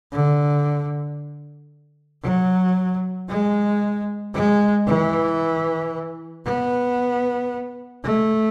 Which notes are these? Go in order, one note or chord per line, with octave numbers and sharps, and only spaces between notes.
D3
F#3
G#3
G#3
E3
B3
A3